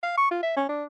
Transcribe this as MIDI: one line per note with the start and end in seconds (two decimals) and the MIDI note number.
0.03 0.15 77
0.17 0.29 85
0.31 0.42 65
0.42 0.56 76
0.56 0.66 61
0.69 0.84 62